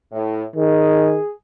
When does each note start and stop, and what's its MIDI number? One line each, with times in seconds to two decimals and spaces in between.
0.12 0.44 45
0.56 1.18 51
0.56 1.30 68